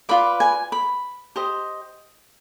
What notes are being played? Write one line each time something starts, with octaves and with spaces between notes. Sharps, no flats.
F4 B4 D5 B5
G#5
B5
G4 C5 D#5